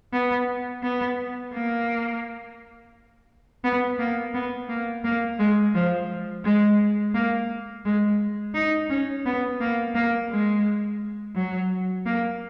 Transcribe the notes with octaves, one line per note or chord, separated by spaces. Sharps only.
B3
B3
A#3
B3
A#3
B3
A#3
A#3
G#3
F3
G#3
A#3
G#3
D#4
C#4
B3
A#3
A#3
G#3
F#3
A#3